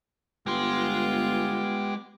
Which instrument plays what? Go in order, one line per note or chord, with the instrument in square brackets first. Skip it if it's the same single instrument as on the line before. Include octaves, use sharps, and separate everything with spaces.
[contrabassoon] G1 [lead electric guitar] G#3 C6 [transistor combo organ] B3 G4 D6 [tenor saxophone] F4